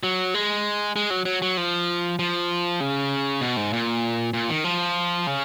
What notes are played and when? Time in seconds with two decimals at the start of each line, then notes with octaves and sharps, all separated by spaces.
0.03 F#3
0.34 G#3
0.96 G#3
1.10 F#3
1.25 F#3
1.42 F#3
1.57 F3
2.19 F3
2.80 C#3
3.41 B2
3.57 G#2
3.73 A#2
4.33 A#2
4.49 D#3
4.64 F3
5.27 C#3